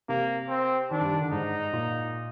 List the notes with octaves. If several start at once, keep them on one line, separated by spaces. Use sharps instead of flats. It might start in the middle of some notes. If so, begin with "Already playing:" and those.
C3 A#3
C4
D#3 D4
G2
D#3
D3
G#2 D#4
A#2